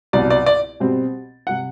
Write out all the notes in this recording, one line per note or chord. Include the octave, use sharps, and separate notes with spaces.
C2 B2 F#3 D5
D5
D5
B2 G3 C4
C3 G3 F#5